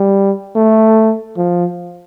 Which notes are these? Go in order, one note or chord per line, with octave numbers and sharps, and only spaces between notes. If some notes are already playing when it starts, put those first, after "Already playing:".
Already playing: G3
A3
F3